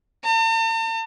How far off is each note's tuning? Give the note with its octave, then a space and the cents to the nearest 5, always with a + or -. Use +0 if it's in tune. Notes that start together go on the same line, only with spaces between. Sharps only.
A5 +45